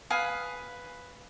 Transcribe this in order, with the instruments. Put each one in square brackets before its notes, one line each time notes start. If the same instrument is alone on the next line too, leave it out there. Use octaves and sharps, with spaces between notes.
[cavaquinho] B4 F5 G#5 D#6